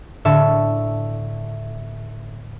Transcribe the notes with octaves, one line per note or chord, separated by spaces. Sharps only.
A2 D3 E5 A5 C#6